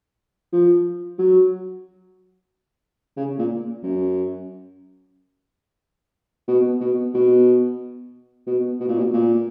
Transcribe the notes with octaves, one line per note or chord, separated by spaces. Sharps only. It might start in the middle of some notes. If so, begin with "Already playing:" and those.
F3
F#3
C#3
A#2
F#2
B2
B2
B2
B2
B2
A#2
B2
A#2